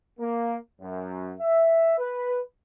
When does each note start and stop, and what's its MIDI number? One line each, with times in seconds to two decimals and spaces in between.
0.20 0.56 58
0.81 1.34 42
1.41 1.95 76
1.98 2.40 71